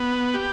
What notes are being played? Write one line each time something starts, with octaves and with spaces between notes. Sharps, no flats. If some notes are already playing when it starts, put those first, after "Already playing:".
Already playing: B3
G4